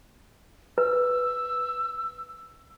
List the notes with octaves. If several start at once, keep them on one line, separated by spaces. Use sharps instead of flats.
B4 E6